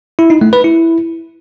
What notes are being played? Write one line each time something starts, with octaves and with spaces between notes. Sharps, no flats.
E4
D#4
A3
B4
E4